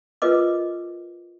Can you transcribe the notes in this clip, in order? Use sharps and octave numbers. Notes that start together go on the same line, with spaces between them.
F4 A#4 B4 D#5 D6